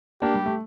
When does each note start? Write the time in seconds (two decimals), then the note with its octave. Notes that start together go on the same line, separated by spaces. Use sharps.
0.22 A#3 D4 G4
0.34 G3
0.46 A3